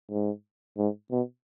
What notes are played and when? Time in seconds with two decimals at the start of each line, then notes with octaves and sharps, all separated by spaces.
0.11 G#2
0.78 G#2
1.11 B2